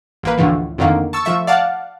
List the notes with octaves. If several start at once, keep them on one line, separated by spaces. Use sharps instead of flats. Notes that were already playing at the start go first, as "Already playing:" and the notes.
A1 A#3 B4
A1 D2 A2 D3 E3 F3
F2 A2 D3 D#3 A#3
A5 C#6 E6
F3 A3 E5 C#6
D5 F5 F#5 A5